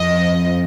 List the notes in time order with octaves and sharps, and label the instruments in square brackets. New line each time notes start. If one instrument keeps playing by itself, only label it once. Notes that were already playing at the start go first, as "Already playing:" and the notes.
Already playing: [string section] F2 F3 D#5